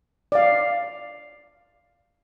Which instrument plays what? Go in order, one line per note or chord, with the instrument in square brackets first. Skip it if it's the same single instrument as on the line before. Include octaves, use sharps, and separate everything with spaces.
[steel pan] D5 F5